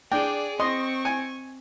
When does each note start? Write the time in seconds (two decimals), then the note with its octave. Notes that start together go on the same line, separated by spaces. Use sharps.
0.12 D4 G#4 D5 G5
0.60 C4 D#5 C6 C#6
1.05 G#5